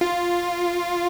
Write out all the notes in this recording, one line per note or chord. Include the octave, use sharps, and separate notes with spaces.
F4